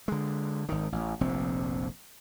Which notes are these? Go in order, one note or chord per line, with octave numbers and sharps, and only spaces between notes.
D3 G#3
G#1 D#3
A1
F1 A#1 C3 C4